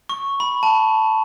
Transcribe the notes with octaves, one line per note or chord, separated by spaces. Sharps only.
C#6
B5
A5